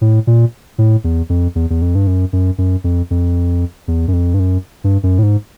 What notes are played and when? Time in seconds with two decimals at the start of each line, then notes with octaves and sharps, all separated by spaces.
0.01 A2
0.27 A#2
0.78 A2
1.04 E2
1.29 F2
1.55 E2
1.70 E2
1.82 F2
1.95 G2
2.07 F#2
2.33 F#2
2.58 F#2
2.84 F2
3.11 F2
3.88 E2
4.08 F#2
4.13 F2
4.34 G2
4.40 F#2
4.84 G2
5.03 F#2
5.19 A2
5.23 G#2